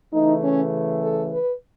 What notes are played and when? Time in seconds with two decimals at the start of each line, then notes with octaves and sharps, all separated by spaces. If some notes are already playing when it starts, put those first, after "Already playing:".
0.12 C#3 E3 A3 D#4
0.43 C#4
1.02 A4
1.31 B4